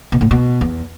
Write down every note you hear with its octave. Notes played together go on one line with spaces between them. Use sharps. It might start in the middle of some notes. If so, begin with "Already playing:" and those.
B2
A2
B2
E2